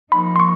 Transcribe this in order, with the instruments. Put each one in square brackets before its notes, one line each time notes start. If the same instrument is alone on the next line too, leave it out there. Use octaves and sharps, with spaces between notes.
[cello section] F3 A#3 D#4 [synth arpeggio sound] B5
[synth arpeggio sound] C6
C#6